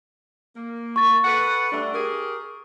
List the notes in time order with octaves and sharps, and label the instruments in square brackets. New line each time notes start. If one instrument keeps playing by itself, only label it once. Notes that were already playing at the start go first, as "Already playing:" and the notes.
[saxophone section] A#3
[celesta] C#6 A6
[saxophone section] A4 B4 F#5
G3 A3 D4
G4 G#4 A#4